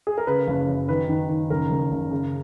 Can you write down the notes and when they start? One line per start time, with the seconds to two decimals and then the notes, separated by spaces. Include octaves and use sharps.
0.07 G#4
0.18 A#4
0.27 C#3 B4
0.47 F#1
0.69 F#2
0.89 D#3 B4
1.09 D#3
1.29 D#3
1.50 F#1 A#4
1.70 F#1
1.91 F#1
2.11 C#3